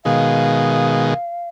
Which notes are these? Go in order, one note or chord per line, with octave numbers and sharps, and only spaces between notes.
B2 D#3 G#3 F5